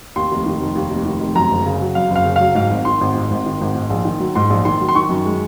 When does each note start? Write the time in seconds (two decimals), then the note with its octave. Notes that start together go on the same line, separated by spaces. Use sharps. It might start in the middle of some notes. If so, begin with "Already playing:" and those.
0.16 D#2 C6
0.31 F1
0.46 D#3
0.61 F1
0.75 D#2
0.91 F1
1.05 D#3
1.20 F1
1.35 F#2 A#5
1.51 F#1
1.66 C#3
1.81 F#3
1.95 F#2 F5
2.10 F#1
2.16 F5
2.25 C#3
2.36 F#3 F5
2.55 G#2 F5
2.71 G#1
2.85 D#3 C6
3.01 G#1
3.15 G#2
3.31 G#1
3.46 D#3
3.61 G#1
3.76 G#2
3.90 A#1
4.05 D#3
4.20 F#3
4.35 G#2 C6
4.50 A#1
4.65 D#3 C6
4.81 F#3
4.89 C6
4.95 D#3 C#6
5.09 F#2
5.26 G#3